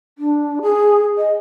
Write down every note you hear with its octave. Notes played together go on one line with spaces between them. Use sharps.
D4
G#4
D#5